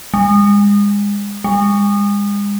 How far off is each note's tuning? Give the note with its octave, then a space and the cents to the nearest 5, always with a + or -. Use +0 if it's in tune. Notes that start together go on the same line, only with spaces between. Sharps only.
G#3 -30
G#3 -35